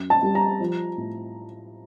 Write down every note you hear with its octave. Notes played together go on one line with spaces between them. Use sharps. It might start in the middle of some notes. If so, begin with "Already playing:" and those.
Already playing: F#2
A5
G3
A#5
F3
A2